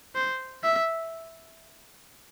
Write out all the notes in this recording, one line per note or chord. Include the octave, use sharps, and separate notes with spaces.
C5
E5